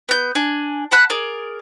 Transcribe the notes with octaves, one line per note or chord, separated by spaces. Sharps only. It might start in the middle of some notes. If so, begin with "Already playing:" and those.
B3 G6
D4 G#5
F#5 A5 B5 F#6
G#4 A#4 D5